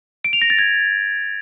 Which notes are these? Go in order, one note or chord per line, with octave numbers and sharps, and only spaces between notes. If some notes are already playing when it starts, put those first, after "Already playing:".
D7
F7
A#6
A6
G#6